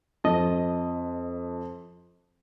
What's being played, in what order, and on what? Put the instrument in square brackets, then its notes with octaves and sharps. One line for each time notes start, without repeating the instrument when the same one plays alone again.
[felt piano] F2 [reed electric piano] D#5 A5